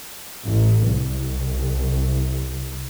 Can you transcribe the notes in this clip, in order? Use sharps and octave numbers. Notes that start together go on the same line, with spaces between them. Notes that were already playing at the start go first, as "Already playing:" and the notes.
A1
C2